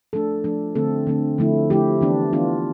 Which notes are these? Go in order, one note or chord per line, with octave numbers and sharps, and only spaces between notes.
F3 A3 D4 A4
F3 A3 D4
D3 A3 C4 A4
D3 A3 C4
D3 F3 A3 E4
D3 F3 A3 E4 G4
E3 B3 D4
E3 B3 D4 F4